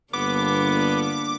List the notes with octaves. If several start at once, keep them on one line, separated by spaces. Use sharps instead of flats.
G1 D3 A#3 B3 D4 D6